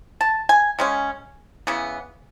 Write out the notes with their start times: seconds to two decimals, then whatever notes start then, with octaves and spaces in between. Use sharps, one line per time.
0.21 A5
0.49 G#5
0.79 C#3 G#3 C#4
1.67 C#3 E3 B3